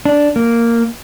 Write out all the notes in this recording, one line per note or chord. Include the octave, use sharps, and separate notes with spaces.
D4
A#3